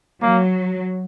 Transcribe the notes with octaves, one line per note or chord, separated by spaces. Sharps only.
F#3 A#3